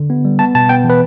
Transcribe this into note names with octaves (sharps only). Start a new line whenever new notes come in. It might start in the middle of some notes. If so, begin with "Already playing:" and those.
Already playing: D3
B3
G3
B3 A5
B2 A5
B3 G5
E3
B4